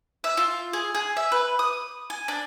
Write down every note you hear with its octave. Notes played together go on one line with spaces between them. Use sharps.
E5
F4
G#4
G#4
E5
B4
D#6
G#5
D4